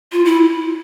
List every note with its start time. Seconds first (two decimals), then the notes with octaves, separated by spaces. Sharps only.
0.12 F4
0.25 E4